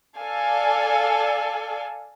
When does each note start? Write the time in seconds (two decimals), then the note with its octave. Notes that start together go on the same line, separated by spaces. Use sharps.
0.17 A4 D5 F5 G#5